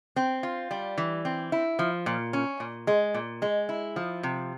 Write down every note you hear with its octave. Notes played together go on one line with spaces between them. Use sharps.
C4
F4
G3
E3
C4
E4
F3
A#2
C#4
A#2
G#3
A#2
G#3
E4
F3
C3